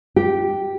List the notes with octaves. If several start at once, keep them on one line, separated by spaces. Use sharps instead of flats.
G4